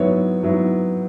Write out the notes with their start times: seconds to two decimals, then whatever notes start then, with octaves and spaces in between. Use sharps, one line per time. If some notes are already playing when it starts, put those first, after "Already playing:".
Already playing: G#2 F#3 B3 E4 C#5
0.43 G#2 F#3 B3 E4